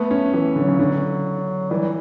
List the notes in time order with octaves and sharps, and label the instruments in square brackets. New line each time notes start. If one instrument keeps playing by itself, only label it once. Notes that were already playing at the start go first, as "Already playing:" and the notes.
Already playing: [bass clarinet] A3 [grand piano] B3
[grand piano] C#4
E3
[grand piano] D3 [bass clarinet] F#3
[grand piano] C#3
D3
[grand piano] E3 [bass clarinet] G3